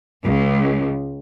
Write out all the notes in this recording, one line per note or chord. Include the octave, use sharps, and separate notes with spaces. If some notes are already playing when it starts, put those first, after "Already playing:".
C#2